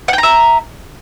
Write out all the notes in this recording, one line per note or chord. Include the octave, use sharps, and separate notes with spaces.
E5 F#5 G5 A#5